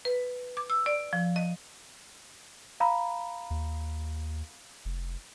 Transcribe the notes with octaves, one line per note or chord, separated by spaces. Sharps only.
B4
D6
E6
D5
F3
D#5
F5 A#5 B5
D#2
F1